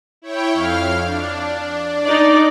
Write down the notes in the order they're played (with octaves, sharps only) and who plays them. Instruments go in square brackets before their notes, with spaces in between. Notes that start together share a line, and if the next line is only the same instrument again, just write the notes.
[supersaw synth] E4 C#5 G5
F2 F5 F6
D4
[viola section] D#4 D5